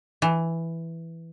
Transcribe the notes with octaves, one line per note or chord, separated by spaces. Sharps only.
E3